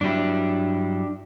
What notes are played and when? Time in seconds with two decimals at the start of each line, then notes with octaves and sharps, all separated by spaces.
0.01 G2 F#3 D4 E4 G4